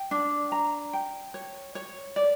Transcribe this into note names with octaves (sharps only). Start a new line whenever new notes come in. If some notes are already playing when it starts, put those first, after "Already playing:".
Already playing: G5
D4
A#5
G5
C#5
C#5
D5